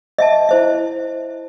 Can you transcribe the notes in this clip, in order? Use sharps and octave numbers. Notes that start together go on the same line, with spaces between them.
D#5 E5 A5
E4 C5 E5